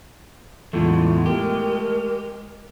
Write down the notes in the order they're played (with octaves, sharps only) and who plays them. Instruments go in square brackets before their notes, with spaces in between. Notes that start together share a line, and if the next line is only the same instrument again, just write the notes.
[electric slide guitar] E2 A2 [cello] G#3 [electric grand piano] A3 [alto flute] F4
[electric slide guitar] G4 [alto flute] A#4